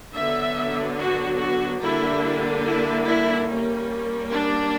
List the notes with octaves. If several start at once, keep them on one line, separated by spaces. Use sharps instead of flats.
D3 F#3 B3 D4 E5
F#4
F#4
D3 G3 A#3 D4 E4
E4
E4
G3 A#3 C#4
D4